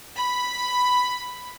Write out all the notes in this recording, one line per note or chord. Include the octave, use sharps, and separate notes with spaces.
B5